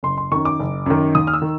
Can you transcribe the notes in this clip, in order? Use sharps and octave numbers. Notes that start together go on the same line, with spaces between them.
F#1 C6
C6
F#2 D#3 C#6
D6
F#1
F#2 D#3
D#2 D#6
F6
E6
D#3